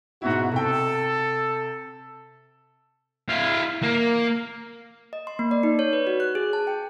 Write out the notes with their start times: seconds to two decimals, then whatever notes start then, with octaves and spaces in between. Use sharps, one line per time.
0.22 G#2 B2 E4 F#4
0.52 C3 A4 G5
3.30 E4 F5
3.83 A#3
5.13 D#5
5.27 C6
5.39 A#3
5.51 D5
5.63 D#4
5.79 C#5
5.93 B4
6.07 F#4
6.20 F#6
6.35 G#4
6.53 A5
6.67 G5